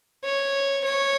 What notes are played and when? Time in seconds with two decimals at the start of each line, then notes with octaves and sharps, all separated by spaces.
0.24 C#5
0.84 C#5